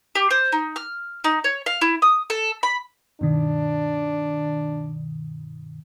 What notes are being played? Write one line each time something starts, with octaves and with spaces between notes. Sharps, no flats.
G4
C5
D#4
F6
D#4
C#5
F5
E4
D#6
A4
B5
G2 B2 D#3 D4